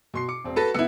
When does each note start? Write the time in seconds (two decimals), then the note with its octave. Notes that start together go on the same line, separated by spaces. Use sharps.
0.14 B2 C6 C7
0.29 D6 C#7
0.44 E1 C4
0.56 F#4 A4 B4 A#6
0.74 C#2 B3 E4 E6 C#7